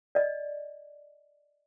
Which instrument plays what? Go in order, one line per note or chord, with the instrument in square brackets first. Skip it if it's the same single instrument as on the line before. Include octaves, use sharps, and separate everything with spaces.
[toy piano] D5 D#5